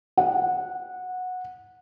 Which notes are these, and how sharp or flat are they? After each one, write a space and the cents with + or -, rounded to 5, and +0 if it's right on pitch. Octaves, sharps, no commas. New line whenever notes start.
F#5 -15